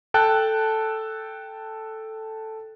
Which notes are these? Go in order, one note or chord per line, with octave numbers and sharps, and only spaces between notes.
A4 G5 A5 F#6